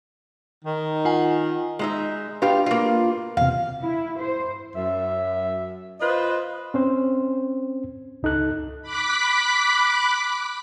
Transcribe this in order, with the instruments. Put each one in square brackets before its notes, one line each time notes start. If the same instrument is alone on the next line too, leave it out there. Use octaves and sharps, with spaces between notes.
[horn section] D#3
[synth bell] F4 F#5 G#5
[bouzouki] G#3 D#4 E5
[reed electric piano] D4 B4 [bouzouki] F4 G4 F5
[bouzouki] A#3 F4
[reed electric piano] E2 C3 [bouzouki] F5
[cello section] E4
C5
[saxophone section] F#2 E5
F4 B4 C5 D#5
[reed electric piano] C4 C#4 C5
C#2 D#4 A4 F#6
[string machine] B5 D6 F#6 B6